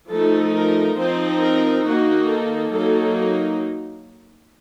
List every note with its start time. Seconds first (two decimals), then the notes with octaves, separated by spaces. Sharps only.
0.09 F3 A3 D#4 A4
0.53 A#4
0.97 F3 C4 D#4 C5
1.40 A#4
1.84 D#3 A#3 D#4 F#4
2.28 A4
2.71 F#3 A#3 D#4 A4